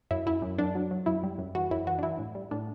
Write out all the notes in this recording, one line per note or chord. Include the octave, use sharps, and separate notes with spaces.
F#2 E4
F#2 E4
F#2
F#2 D4
F#3
F#3
F#2 E4
G3
F#2
E3 F#4
F#2 E4
E3 F#4
D4
E3 E4
A2
G3
A2 D4